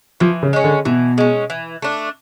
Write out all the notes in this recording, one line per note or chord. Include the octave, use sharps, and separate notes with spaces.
E3 F3
C#3
G#3 C#4
D3
B2 E3
G#3 C#4
E3
A3 D4